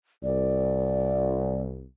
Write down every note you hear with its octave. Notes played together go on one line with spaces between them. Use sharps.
C2 D5